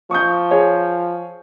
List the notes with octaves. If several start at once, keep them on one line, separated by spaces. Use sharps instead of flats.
F3 C#6 D#6 G6
G#4 C#5